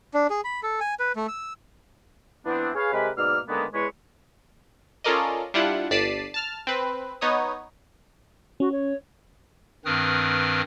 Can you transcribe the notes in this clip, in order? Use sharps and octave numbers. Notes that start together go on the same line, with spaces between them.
D4
G#4
B5
A4
G#5
B4
A3
E6
E3 B3 C4 D4
G#4 B4 C#5 F5
C3 G#3 G4 G#4 A#4 B4
G#2 B2 A#3 D5 E6 F6
D3 D#3 G#3 A#3 B3
E2 G#3 B4 C#5
C#4 F4 A4 A#4 D5 D#5
G3 D4 E4 F4 F#5
G1 D5 A5 B6 C7 D#7
A5 F6
C4 B4
B3 D#4 C#5 D#6
C#4 F#4
C#5
G2 D#3 C4 B4 D#6 F6